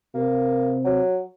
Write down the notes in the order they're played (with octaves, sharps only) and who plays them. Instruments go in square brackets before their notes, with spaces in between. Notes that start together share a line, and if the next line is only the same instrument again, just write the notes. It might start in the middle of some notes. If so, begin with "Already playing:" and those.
[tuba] C3 [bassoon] A#3
[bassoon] F#3